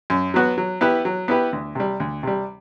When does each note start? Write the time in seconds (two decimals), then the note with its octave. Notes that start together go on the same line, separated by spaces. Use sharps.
0.10 F#2
0.34 F#3 B3 F#4
0.58 F#3
0.81 B3 E4 G4 B4
1.05 F#3
1.28 B3 E4 G4 B4
1.53 D2
1.75 C3 G3
2.00 D2
2.23 C3 G3